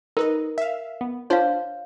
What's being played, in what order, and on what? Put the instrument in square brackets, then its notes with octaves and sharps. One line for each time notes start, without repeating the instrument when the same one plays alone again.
[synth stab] D#4 B4 D#5 [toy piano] A#4
[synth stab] E5 F5
B3
[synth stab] D4 F4 C5 [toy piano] C#5 F5